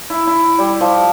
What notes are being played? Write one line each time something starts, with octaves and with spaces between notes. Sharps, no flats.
E4
E4
G3
F3